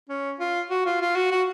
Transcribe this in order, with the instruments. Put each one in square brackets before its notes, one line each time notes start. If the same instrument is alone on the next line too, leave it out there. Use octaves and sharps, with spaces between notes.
[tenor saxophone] C#4
F4
F#4
F4
F4
F#4
F#4